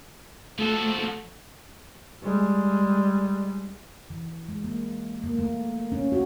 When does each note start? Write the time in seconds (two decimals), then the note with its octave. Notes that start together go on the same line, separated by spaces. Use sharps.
0.59 F3 A3 F#4 A4
2.21 G3 G#3
4.10 E3
4.49 G#3
4.64 A#3
5.24 A#3
5.39 A3
5.92 C#4
6.12 F#4